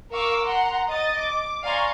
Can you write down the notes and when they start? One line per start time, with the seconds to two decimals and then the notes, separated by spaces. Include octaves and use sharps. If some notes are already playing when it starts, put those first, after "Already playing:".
0.11 A#4 F5 C#6 D6 E6
0.44 F#5 A#5 C6
0.89 D#5 D#6 A6
1.18 D6
1.63 D5 F5 G#5 A#5 C6 C#6